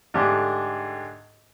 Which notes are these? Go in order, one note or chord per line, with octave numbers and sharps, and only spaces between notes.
G#2 D3 A3 G4